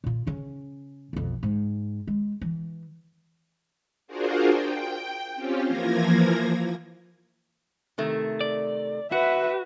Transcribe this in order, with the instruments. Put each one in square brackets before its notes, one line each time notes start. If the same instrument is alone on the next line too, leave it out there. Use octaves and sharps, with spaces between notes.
[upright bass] A#2 F4
C#3 C#4
B1 F2
G#2
G#3
E3
[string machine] D4 F4 F#4 G#4 A#4 C5
G5
C4 C#4 F4 G4
E3 F3 A#3 G#6 A#6
[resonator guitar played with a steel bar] C3 D#3 A3
[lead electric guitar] D5
[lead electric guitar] F#4 [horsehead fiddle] B4 E5 [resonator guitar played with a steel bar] F#5